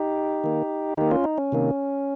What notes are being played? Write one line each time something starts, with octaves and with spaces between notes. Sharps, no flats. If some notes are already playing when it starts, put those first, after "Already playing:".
Already playing: D#4 G4
D#3 A#3
D#3 A#3 D#4 G4
C#4 F4
D#4
C#4
C3 D#3 A#3